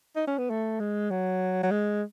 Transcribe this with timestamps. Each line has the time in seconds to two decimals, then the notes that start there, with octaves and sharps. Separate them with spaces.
0.16 D#4
0.27 C#4
0.38 B3
0.50 A3
0.80 G#3
1.11 F#3
1.63 F#3
1.71 G#3